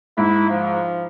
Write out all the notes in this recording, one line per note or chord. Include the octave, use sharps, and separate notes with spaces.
G#2 E4
F3